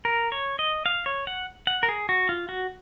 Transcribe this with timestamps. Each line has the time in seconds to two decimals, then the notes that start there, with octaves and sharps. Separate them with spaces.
0.05 A#4
0.32 C#5
0.59 D#5
0.86 F5
1.06 C#5
1.27 F#5
1.67 F#5
1.83 A#4
1.88 G#4
2.09 F#4
2.29 F4
2.49 F#4